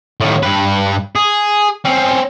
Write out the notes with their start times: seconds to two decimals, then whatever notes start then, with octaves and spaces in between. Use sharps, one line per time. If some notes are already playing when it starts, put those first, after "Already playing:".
0.21 A2 D#3
0.43 G2 B4
1.16 G#4
1.85 C4 C#4